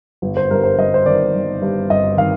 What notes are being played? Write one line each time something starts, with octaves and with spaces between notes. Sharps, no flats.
G1
C5
G2 A#4
C5
G1 D#5
C5
D#3 D5
G1
G2
G1 D#5
D#3 F5